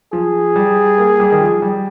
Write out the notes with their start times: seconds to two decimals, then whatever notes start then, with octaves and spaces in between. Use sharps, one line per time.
0.12 F3 G#4
0.56 G3
0.98 A#3
1.20 G3
1.32 D#3
1.41 F3
1.62 G3